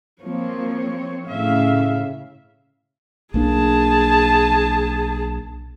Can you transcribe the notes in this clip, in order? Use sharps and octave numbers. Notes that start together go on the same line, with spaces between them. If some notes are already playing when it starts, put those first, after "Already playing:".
F3 A#3 C4 C#5
A2 C#3 E5 F5
B1 A#3 D4 G#4 A5